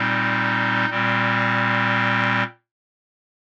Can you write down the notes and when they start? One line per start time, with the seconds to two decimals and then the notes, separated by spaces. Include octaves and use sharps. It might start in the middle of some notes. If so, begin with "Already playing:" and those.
Already playing: A#2 G3 C4 D#4
0.89 A#2 G3 C4